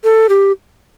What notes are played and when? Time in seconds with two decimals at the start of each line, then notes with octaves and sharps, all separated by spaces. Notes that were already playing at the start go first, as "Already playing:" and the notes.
0.04 A4
0.29 G4